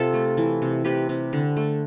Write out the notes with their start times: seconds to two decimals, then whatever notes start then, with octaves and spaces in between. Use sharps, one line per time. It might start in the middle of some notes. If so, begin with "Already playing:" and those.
Already playing: C3 F4 G4 A4
0.14 A3
0.37 E3
0.62 C3
0.84 C3 G4 B4
1.09 C3
1.33 D3
1.57 A3